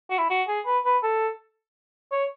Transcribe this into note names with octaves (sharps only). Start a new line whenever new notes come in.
F#4
E4
F#4
G#4
B4
B4
A4
C#5